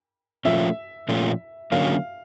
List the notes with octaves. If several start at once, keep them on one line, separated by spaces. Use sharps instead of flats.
A#2 F3 A3 C#4 F4 E5
A#2 F3 A3 C#4 F4
D3 F#3 A#3 C#4 F5